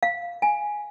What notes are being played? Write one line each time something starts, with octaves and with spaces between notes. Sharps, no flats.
F5
G#5